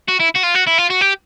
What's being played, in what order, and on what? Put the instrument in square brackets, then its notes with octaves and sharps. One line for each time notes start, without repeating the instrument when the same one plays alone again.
[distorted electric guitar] F#4
E4
F#4
F4
F#4
E4
F4
F#4
G4